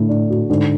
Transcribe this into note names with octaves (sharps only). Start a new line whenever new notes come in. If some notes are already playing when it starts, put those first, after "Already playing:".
Already playing: A2 D3 A3
D4
F#4
G#2 D3